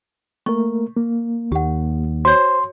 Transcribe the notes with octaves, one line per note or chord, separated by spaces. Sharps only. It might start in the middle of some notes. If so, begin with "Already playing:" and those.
A3 A#3 A#4 C#6
A#3
D#2 G4 F#5
F#4 C5 C#5 C6